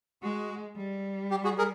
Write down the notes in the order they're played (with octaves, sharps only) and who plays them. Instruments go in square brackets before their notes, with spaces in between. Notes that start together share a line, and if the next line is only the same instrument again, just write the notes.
[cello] G#3 [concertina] F#4
[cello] G3
[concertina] G4
F#4 G#4
G#4 A#4